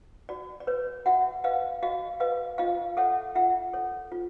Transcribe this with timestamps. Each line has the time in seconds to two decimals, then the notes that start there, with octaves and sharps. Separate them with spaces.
0.29 F#4 D5
0.60 D5
0.67 B4 C#5
1.06 F#4 E5 F#5
1.44 B4 D#5 F5
1.83 F#4 D#5 F5
2.20 B4 D#5 F5
2.58 F4 D#5 F5
2.97 A4 C#5 E5 F#5
3.35 F4 E5 F#5
3.73 A4 C#5
4.12 F4